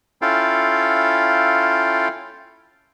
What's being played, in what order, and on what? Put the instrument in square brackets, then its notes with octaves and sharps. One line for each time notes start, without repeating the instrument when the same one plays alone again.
[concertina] C#4 E4 F4 A4 F5 G5